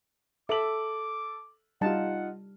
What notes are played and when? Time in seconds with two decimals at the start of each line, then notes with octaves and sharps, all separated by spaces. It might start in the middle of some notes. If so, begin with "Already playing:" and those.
0.49 A4 E5 D6 F#7
1.81 G3 D#4 F4 F#5 A5